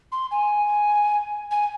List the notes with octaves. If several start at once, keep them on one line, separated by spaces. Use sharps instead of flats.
C6
G#5
G#5